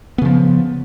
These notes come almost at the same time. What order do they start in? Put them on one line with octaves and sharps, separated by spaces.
B3 C#3 F3